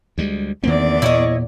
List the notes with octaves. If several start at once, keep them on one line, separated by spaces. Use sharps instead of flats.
D2 G3 G#3
E2 D#3 A#3 C4 D5
A#2 E4 C#5 D#5